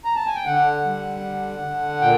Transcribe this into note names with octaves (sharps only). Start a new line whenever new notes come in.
A#5
A5
G#5
G5
D3 F#5
G3
D3
D3
A#2 G5